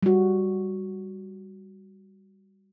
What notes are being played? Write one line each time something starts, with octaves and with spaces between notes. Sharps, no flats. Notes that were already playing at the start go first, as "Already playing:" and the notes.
G3 F#4